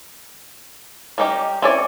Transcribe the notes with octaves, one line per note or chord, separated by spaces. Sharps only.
G3 C#4 D#4 G4
C4 C#4 E4 C#5 D5